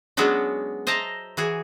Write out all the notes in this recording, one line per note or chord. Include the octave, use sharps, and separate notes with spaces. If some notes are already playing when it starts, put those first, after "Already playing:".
F#3 G#3 B3 C#4 D4 F#4
C5 D#5 E5 A5 A#5
E3 F#4 G#4